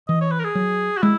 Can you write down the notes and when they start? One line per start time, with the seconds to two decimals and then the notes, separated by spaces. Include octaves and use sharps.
0.08 E3 D#5
0.21 C#5
0.32 B4
0.40 A#4
0.44 G#4
0.55 F#3
0.97 F#4
1.02 G#3 E4